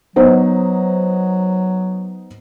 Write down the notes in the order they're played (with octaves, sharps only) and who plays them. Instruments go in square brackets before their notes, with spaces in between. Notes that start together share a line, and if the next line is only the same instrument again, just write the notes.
[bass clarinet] F#3 [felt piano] B3 D#4 C5